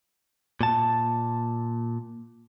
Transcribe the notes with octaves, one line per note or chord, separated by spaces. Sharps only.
A#2 A5